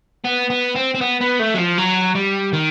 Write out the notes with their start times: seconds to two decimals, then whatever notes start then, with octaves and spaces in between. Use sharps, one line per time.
0.24 B3
0.50 B3
0.76 C4
0.95 C4
1.01 B3
1.21 B3
1.39 A3
1.54 F#3
1.58 F3
1.78 F#3
2.15 G3
2.53 D#3